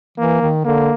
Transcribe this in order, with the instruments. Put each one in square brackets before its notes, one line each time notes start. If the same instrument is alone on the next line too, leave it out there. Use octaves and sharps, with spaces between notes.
[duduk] E3 [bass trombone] A#3
[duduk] D#3
[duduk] D3 [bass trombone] A#3